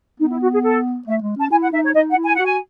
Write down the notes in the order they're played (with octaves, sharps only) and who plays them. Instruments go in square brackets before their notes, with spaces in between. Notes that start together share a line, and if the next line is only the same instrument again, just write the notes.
[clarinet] B3 [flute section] D#4
[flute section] E4
F#4
G#4
A4
[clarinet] A3 [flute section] E5
[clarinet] G#3
[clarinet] C#4 [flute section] A5
[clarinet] E4 [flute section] G#5
[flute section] F#5
[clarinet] D#4 [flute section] E5
[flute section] C#5
[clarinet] D#4 [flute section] D#5
[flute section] F#5
[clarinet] E4
[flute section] G#5
[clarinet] F#4 [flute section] F#5
[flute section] G#5